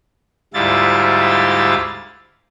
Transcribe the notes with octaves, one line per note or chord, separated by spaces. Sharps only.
D2 G#2 G3 E4 F4 A6